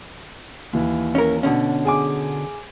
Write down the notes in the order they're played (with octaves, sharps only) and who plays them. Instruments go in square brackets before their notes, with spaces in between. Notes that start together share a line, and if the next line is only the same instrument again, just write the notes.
[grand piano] D#2 E3
[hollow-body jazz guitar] C#4 A#4
B2 D3 C#4
[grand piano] G#4 G#5 D6